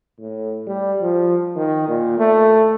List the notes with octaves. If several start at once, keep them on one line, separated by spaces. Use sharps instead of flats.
A2
G3
F3
D#3
A#2
A3